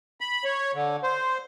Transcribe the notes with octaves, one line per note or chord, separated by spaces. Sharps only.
B5
C#5
D3
C5